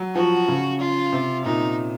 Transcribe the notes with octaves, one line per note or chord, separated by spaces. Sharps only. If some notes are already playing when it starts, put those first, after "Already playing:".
Already playing: F#3
F3 F#4
C#3
F4
C3
A#2 D#4